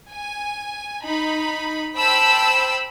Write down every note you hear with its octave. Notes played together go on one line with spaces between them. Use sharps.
G#5
D#4 B5
C5 G5 A5 B5 E6